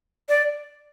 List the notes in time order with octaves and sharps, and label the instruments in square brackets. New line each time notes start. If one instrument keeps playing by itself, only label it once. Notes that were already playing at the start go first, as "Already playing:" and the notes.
[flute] D5